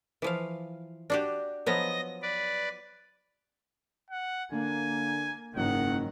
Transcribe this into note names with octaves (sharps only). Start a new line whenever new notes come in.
E3 F3 F5
D4 F#4 G4
F3 F#3 B3 D#5 A#6
B4 D5
F#5
D3 A#3 G#5
F#1 G#2 D#3 F#3 F#5